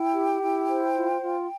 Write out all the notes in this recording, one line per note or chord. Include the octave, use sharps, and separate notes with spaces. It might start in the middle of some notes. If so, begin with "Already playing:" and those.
Already playing: E4 G5
G4
E4
C5
F4
F4